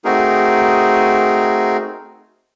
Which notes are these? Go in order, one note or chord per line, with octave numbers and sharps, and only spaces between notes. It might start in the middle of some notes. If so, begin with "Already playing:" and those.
A3 C4 D#4 F#4 G#4 A#4